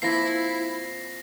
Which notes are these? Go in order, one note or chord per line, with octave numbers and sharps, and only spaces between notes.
F3 A#3 C4 E4 A#6 C7